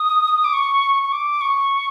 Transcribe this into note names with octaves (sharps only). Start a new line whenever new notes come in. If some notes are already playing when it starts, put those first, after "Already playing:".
Already playing: D#6
D6
C#6
C#6
D6
C#6